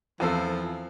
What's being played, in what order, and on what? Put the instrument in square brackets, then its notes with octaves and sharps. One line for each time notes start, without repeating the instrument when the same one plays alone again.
[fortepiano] E2 C4 A4 [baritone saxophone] F3